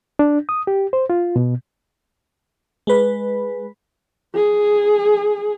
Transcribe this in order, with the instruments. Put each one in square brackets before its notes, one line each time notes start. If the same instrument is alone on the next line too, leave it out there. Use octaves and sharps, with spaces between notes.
[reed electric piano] D4
D#6
G4
C5
F4
B2
[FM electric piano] G#3 B4
[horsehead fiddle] G#4